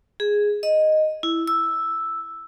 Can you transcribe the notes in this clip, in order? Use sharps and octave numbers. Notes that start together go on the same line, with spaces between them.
G#4
D#5
E4
E6